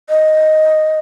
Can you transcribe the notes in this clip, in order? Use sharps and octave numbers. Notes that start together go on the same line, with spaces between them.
D#5